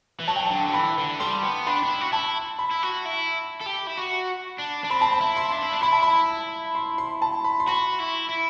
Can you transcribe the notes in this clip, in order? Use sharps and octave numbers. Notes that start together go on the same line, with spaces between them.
E3
F#3 A5
G5
A5
D3
F#3
E3 B5
D3
G3 C6
B3
D4 B5
D4
E4
F#4
E4 A5
B5
E4
F#4
E4
A4
G4
E4
F#4
D4
D4
C4 B5
A5
B5
E4
C6
D4
E4
D4
E4 B5
A5
B5
C6
C6
A5
B5
C6
F#4 B5
E4
E4